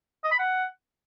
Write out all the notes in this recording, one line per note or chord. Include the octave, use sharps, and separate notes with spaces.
D#5
B5
F#5